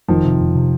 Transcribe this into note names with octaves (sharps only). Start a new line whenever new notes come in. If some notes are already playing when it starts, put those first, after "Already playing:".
F1 D#3 F3
C3
F1
C3